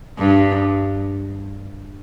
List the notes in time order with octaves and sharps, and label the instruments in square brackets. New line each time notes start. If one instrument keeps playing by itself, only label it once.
[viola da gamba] G2